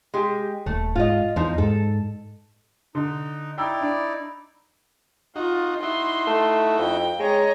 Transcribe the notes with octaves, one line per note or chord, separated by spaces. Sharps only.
G#3 G4
D#1 A3
G#2 F4 D#5
E2 F3 D#4
G#2 A4
D3 D#4
D#4 E4 D5 G5 A#5 E6
D4
D#4 F4 F#4
D#4 E4 F#4 C6
A3
F2 G5
G#3 C#5 D#5 A#5